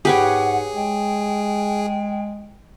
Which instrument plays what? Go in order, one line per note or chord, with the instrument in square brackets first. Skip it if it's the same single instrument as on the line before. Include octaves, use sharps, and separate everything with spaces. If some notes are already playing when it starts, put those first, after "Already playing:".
[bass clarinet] G#2 [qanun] G4 B4 C#5 [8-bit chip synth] G#4 [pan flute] F#5
[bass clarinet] G#3 [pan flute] G5